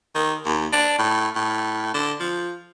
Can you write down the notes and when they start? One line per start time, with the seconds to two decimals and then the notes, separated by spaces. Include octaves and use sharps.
0.15 D#3
0.46 D#2
0.73 D4
0.98 A2
1.35 A2
1.94 D3
2.20 F3